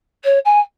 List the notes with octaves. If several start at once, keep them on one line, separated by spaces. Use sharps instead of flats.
C#5
G#5